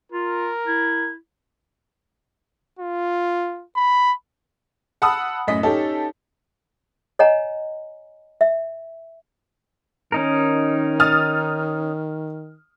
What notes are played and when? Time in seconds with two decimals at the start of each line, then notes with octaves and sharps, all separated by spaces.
0.12 F4 A#4
0.67 E4
2.79 F4
3.76 B5
5.02 F#5 A5 B5 D#6 E6
5.47 F#2 A2 D#5 B6
5.63 C#4 D#4 G4 A4
7.19 C#5 D#5 F#5 G#5 A#5
8.41 E5
10.12 D#3 C#4 D#4 A#4
11.00 D#6 F6 A6